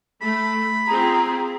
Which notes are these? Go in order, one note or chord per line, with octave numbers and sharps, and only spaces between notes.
A3 B5
C4 F4 G#4 A#5